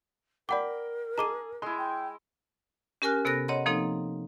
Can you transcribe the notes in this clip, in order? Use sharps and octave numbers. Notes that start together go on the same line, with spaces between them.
A#4 D5 F#5 G5 B5 D6
G#4 D#5 A5 A#5 D6 D#7
G#3 E4 C6
G5
C#4 G4 A#4 G#5 F6 F#6
C3 B3 A4 F#6 A#6
C#5 D#5 F#5 A#5 C6
F3 A#3 C4 D#4 A4